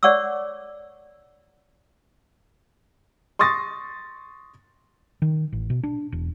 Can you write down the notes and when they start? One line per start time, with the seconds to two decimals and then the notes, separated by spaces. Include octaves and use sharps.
0.03 C#5 D5 F#5 C#6 D6 E6
3.39 C6 C#6 D#6 A6 A#6
5.22 D#3
5.53 A1
5.70 B2
5.83 D4
6.12 E1